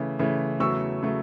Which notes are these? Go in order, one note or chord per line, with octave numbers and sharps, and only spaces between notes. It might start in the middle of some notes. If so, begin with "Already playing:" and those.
Already playing: C#3 E3 A3
C#3 E3 A3
E2 C#3 F#3 A3 C#6 E6
C#3 F#3 A3